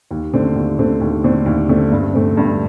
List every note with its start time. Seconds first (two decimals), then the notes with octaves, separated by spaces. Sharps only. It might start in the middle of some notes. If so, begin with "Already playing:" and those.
0.11 D#2
0.33 D3 A3 C4
0.55 D#2
0.79 D3 A3 C4
1.01 D#2
1.24 D3 A3 C4
1.46 D#2
1.69 D3 A3 C4
1.92 G2
2.14 D3 A3 C4
2.37 G2